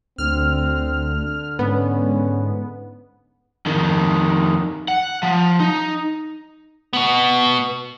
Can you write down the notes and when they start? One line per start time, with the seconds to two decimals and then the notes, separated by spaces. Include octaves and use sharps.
0.18 D2 D3 C4 F6
1.59 G#2 B3 C#4
3.66 F2 D#3
4.88 F#5
5.23 F3
5.60 D#4
6.93 B2 B3